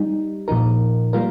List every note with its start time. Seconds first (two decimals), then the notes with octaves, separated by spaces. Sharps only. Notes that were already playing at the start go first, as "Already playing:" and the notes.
Already playing: G3 D#4
0.48 A#2 F3 D#4 A#4
1.13 G3 A#3 F4 A#4